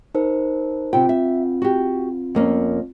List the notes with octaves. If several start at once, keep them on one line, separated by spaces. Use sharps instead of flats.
D#4 A#4 C5
C3 C4 F4 G5
E5
F#4 G4
F2 A#3 C#4